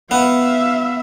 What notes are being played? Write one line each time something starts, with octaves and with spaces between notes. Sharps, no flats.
B3 E5 F5